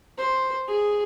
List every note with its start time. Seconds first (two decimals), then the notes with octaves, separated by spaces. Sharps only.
0.18 C5
0.68 G#4